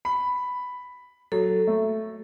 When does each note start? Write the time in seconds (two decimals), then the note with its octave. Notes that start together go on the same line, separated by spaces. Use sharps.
0.05 B5
1.32 F#3 A4
1.67 A3